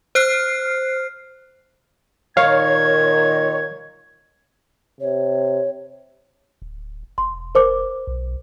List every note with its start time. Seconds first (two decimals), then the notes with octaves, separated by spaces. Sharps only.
0.15 C5 F6 F#6 C7
2.37 A#2 D#3 C#5 F5 G#6
5.00 C3 C#5
6.62 D1
7.18 E1 C6
7.55 A#4 C5 D6
8.07 B1